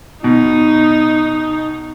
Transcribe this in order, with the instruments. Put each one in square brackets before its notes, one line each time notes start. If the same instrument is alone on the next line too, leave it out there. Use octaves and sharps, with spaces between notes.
[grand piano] B2 [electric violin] D#4